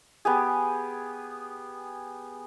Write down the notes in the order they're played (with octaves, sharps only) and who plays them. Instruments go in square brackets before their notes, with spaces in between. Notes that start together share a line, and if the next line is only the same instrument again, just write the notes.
[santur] B3 G4 G#4